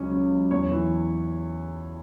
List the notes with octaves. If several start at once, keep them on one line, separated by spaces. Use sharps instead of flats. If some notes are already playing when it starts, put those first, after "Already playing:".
Already playing: C#2 F#3 C#4
C#4
F#3
E2 C#5
E3